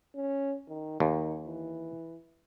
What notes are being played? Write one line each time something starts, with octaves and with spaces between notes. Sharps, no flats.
C#4
D#3
D#2 D#3
E3